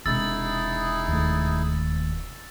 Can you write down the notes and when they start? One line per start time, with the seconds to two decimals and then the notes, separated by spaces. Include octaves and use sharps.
0.06 E1 C3 D#4 E4 G#4 E6 A6
1.08 D#2 A3